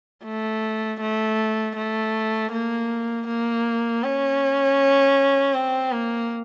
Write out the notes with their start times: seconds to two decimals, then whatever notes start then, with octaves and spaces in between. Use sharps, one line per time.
0.25 A3
1.01 A3
1.77 A3
2.52 A#3
3.28 A#3
4.03 C#4
5.54 C4
5.92 A#3